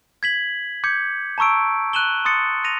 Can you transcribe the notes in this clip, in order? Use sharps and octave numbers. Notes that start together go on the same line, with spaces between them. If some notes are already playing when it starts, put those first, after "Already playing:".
G#6 B6 F#7
D6 G6 G#6 C#7
A5 A#5 C#6 E6 D7
F#6 D#7 E7 F#7 G7
C6 D#6 A6 C#7
A#6 D#7 F7